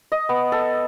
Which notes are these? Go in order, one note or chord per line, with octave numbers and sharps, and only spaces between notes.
D#5
B3
A4